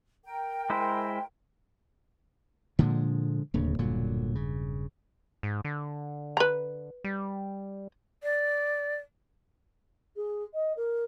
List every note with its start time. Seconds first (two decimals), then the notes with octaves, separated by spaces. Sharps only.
0.25 A#4 G5
0.70 G#3 E4 C5
2.79 A#2 D3 F3 G#3 A#3
3.54 D1 D#2 C#3 A#3 D4
3.79 E1 G2 A#2 D3 F#3
4.35 C#3
5.43 G#2
5.65 D3
6.37 B4 A#5
7.04 G3
8.23 D5
10.16 G#4
10.53 D#5
10.76 A#4